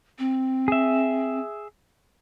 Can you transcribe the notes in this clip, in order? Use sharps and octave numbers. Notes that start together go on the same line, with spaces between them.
C4
G#4 E5